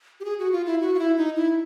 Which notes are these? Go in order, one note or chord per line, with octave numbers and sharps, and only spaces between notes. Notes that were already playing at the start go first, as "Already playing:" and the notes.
G4
G#4
F#4
F4
E4
F#4
F4
E4
D#4
E4